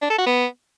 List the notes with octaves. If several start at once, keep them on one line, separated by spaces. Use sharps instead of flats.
D4
A4
F#4
B3